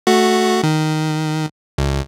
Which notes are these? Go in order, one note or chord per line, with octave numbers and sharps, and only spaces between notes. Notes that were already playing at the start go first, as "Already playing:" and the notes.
A3 F#4
D#3
C#2